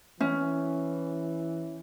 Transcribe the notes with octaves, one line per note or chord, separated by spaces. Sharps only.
E3 C#4